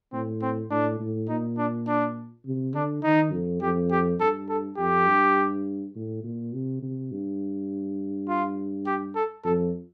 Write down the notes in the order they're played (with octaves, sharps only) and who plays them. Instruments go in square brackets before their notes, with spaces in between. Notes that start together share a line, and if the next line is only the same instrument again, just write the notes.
[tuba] A2 [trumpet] C4
[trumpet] C4
[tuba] A2 [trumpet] D4
[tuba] A2
[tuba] A#2 [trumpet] D#4
[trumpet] D4
D4
[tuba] C3
[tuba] D3 [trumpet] D4
[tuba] D#3 [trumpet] D#4
[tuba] F2
[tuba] F2 [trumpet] G4
[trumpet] G4
[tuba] G2 [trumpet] A4
[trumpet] A4
[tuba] F2 [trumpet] G4
[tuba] G2
A2
A#2
C3
C3
G2
[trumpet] F4
G4
A4
[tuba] F2 [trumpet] A4